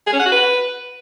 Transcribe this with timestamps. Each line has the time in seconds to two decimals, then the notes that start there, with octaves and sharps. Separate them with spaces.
0.07 G#4
0.13 C#4
0.19 F#5
0.26 F#4
0.32 B4